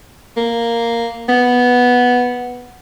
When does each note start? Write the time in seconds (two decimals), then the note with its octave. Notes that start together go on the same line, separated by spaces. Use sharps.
0.37 A#3
1.29 B3